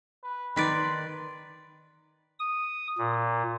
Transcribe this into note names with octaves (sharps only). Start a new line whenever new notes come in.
B4
D#3 B4 D5 C6
D#6
A#2